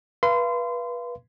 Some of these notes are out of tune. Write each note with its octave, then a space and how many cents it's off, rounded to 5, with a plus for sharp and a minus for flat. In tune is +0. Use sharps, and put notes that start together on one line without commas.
B4 -25 F5 -35 C6 -30